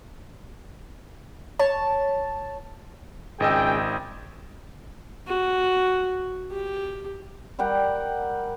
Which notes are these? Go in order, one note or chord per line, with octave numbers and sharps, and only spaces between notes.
C#5 A5
G#1 C#2 G#4 D#5 G5 E6
F#4
G4
G3 A#4 F#5 G5